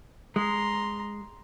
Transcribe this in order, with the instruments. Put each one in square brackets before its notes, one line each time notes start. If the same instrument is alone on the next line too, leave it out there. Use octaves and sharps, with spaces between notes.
[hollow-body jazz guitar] G#3 [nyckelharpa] A#5 C6